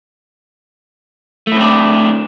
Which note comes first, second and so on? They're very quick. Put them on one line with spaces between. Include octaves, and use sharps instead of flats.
A3 E4 C4 D4